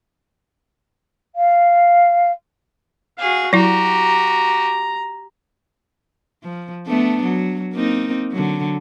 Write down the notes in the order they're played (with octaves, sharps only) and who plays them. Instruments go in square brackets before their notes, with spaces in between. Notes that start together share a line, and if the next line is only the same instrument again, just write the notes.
[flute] F5
[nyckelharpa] F#4 F5 [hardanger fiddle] G#4
[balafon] F#3 E4 [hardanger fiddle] F#4 G4 [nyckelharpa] A#5
[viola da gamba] F3
A3 B3 D4
F#3
A#3 C4 D#4
D3 F#3